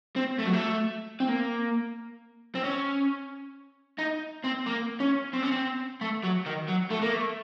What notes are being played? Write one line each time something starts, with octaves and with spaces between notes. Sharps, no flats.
C4
A3
F#3
A3
C4
A#3
C4
C#4
D#4
C4
A#3
C#4
C4
C#4
C4
A3
F#3
D#3
F#3
A3
A#3
A3